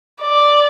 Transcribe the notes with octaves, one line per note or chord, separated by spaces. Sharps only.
D5